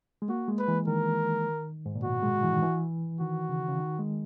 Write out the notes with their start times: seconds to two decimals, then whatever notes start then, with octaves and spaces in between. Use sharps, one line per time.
0.22 G#3
0.28 A#3 F#4
0.48 G#3
0.59 B4
0.68 E3
0.87 D#3 A#4
1.86 G#2
1.95 A#2
2.04 B2 F#4
2.23 G#3
2.43 E3
2.53 D#3
2.62 E3
3.20 D#3 F#4
3.49 C#3
3.68 C#3
3.79 D#3
3.99 G#3